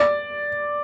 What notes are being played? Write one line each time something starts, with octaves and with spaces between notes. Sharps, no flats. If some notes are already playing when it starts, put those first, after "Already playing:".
Already playing: D5